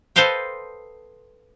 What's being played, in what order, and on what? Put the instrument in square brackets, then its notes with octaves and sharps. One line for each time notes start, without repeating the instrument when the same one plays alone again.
[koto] A4 B4 C5 D#5 F5 G5